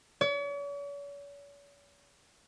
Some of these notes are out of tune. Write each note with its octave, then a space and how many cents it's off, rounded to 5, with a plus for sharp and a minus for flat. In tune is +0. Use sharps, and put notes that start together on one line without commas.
C#5 +45